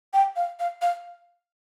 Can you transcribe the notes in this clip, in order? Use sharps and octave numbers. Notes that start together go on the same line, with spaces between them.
G5
F5
F5
F5